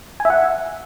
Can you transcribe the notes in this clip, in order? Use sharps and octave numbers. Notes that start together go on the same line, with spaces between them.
G#5
E5
F#5